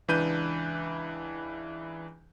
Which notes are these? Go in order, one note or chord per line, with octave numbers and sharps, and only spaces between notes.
C#2 E3 D4 B4 G6 D#7